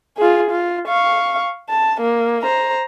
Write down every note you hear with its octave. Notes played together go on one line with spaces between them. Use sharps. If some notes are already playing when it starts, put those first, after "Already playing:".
F4 G#4
F4
F5 C#6
A5
A#3
C5 A#5